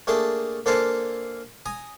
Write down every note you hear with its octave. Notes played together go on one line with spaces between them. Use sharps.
A3 A#3 D4 G#4 G5
A#3 D4 A4 C5 F5 G#5
G#5 A#5 D#6